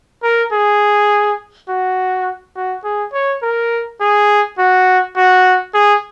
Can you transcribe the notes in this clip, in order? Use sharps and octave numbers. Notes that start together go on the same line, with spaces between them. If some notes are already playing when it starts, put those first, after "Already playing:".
A#4
G#4
F#4
F#4
G#4
C#5
A#4
G#4
F#4
F#4
G#4